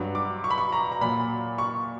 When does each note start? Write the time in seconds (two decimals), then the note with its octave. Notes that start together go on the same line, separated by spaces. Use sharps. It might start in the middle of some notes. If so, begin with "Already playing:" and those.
Already playing: G2 F#3
0.15 D6
0.44 C#6
0.51 B5
0.58 C#6
0.72 A#5
0.92 A#5
1.01 A#2 F#3 B5
1.58 C#6